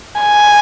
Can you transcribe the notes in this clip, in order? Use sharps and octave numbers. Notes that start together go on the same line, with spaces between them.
G#5